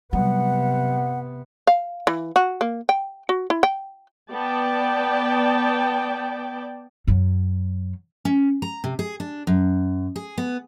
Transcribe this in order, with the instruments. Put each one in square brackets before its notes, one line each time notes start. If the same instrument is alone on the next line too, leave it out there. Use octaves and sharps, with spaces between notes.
[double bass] C3 B3 [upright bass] F#3 G3 [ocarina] F#5
[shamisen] F5
E3
F#4
A#3
G5
F#4
E4
G5
[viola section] B3 D5 G5 A5
[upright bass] F#2 F#3
[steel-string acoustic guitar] C#4
A#5
C3
G#4
D4
F#2
G#4
B3